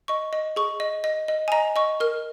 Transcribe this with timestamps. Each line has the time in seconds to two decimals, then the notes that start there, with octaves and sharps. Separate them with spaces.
0.08 D#5 C#6
0.33 D#5
0.56 G#4 C#6
0.80 D#5
1.04 D#5
1.28 D#5
1.48 G#5
1.52 D#5 A#5
1.76 D#5 C#6
2.00 A#4 F6